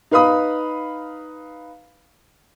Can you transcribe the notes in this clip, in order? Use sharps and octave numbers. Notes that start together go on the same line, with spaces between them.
D#4 B4 F5 B5 D#6